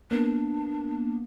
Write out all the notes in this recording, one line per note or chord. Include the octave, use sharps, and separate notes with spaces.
A#3 B3 D4